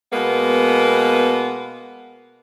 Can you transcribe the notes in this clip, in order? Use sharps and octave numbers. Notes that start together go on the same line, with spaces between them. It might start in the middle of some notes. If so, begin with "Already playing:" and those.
B2 G#3 A#3 B3